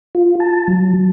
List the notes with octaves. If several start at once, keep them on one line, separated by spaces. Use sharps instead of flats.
F4
A5
F#3